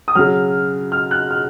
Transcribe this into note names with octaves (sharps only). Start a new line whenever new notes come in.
D#6
C#3 F#3 F6
F6
F#6
F6